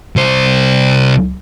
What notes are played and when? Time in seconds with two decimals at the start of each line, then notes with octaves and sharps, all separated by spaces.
0.16 C2 C5